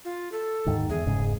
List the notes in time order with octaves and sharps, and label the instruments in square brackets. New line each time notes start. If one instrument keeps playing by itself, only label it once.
[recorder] F4
A4
[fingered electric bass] D#2 G#2 D#3
[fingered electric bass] E2 [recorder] G#4
[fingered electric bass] F1 G#2 C#3